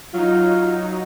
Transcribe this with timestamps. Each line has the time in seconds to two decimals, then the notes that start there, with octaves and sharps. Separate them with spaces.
0.14 F#3 D#4 F4